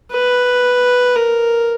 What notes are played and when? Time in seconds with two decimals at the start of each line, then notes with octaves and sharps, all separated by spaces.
0.12 B4
1.16 A#4